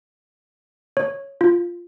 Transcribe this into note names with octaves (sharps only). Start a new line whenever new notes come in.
C#5
F4